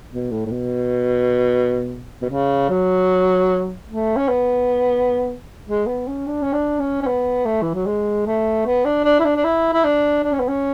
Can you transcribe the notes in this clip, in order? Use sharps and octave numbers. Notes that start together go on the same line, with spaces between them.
B2
A2
A2
B2
B2
C#3
F#3
A3
C#4
B3
G#3
B3
C#4
D4
C#4
D4
C#4
C#4
B3
A3
E3
F#3
G#3
A3
B3
D4
D4
E4
D4
D4
E4
E4
D4
D4
C#4
B3
C#4